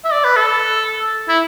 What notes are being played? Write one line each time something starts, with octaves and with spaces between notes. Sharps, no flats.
E5
D5
B4
A4
E4